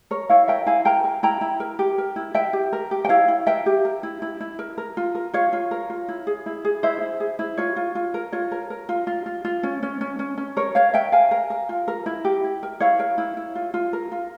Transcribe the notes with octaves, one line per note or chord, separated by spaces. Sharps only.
A#4 C#5
E4 C#5 F5
A#4 E5 G5
E4 F5 G#5
A#4 G5 A#5
A#4
E4 G5 A#5
E4
A#4
G4
A#4
E4
E4 E5 G5
G4
A#4
G4
G5
E4 C#5 F5
E4
A#4 E5 G5
G4
A#4
E4
E4
E4
A#4
A#4
F4
A#4
F4 C#5 F5
F4
A#4
F4
E4
G#4
E4
G#4
E4 C5 E5
E4
G#4
E4
F4 C#5
F4
F4
A#4
F4 C#5
A#4
A#4
F4
F4
F4
F4
C#4
C#4
C#4
C#4
C#4
A#4 C#5
A#4 C#5 F5
A#4 E5 G5
A#4 F5 G#5
A#4
A#4
F4
A#4
E4
G4
E4
A#4
E4 C#5 F5
A#4
E4
E4
F4
F4
A#4
F4